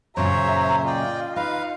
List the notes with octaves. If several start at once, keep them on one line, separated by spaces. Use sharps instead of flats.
F#2 A#2 C#3 C5 C#5 E5 A#5
F4 D5 D#5 G5
D#4 B4 F5